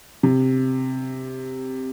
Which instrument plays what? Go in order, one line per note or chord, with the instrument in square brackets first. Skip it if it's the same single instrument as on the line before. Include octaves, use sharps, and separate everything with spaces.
[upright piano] C3